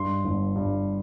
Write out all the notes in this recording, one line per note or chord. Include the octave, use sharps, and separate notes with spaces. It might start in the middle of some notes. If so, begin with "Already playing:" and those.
Already playing: G2 C6
G1
G2